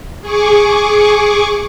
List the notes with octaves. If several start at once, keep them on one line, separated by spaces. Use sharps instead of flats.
G#4 C#6 D6